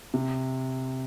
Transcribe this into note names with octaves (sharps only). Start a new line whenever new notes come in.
C3